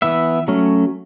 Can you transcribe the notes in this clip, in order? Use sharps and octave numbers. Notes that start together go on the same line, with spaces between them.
E3 B3 E5
F#3 A3 C#4